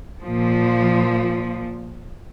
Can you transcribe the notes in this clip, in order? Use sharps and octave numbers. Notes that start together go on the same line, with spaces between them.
A#2 F3